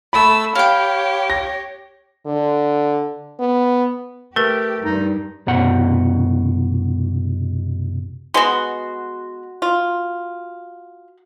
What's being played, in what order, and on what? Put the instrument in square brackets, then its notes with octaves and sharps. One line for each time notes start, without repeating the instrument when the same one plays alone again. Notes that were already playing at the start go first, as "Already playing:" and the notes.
[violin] A3 E6 [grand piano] B5
[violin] G4 C#5 [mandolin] F5 G5
[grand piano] A#6
[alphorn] D3
B3
[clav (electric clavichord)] A3 [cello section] G4 [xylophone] A#4 B4
[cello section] G2 [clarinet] D#4
[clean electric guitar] C2 F#2 B2 F#5
[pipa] G#3 B3 [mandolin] F#4 C6
[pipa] F4